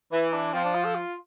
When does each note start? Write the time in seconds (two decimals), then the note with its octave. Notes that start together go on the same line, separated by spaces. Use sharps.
0.12 E3 E4
0.33 D4
0.54 F3 C4
0.65 D4
0.75 F4
0.85 A4
0.95 F4